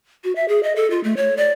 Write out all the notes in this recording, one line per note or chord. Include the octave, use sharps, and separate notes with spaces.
F#4
E5
G#4
D#5
A4
F4
A3
C#5
D5